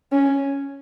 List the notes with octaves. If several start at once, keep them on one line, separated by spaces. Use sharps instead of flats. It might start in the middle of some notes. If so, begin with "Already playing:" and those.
C#4